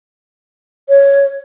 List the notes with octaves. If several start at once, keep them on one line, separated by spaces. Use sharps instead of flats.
C#5